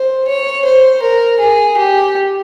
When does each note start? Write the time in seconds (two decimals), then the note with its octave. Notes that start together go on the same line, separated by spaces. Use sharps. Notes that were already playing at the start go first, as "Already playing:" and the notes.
Already playing: C5
0.27 C#5
0.65 C5
1.02 A#4
1.39 G#4
1.77 G4